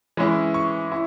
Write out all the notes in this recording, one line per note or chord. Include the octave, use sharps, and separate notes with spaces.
E3 G#3 C#4 E4
C#6
E4